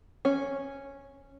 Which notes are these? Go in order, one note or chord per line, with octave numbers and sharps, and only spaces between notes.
C#4